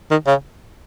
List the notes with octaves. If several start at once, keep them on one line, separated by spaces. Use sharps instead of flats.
D#3
C#3